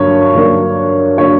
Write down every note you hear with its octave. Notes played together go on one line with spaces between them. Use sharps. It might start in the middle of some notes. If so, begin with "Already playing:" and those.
Already playing: G2 D3 F#3 A#3 C#5
G2 D3 F#3 A#3 D4
D3 F#3 A#3 D4 C#5